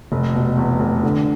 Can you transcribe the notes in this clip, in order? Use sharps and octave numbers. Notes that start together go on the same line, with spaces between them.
F1
B2
E2
F1
D3